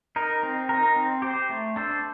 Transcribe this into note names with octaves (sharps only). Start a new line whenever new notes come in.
D#4 A#4
C4
D#4 A#4
C4
G4 C5
A3
D4 A4 C5